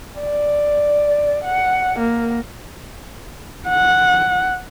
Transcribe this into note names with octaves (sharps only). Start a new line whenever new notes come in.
D5
F#5
A#3
F#5